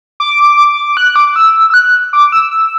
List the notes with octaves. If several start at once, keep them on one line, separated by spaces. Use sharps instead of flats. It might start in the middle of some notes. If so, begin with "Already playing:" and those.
D6
F#6
D6
E6
E6
F#6
D6
E6
E6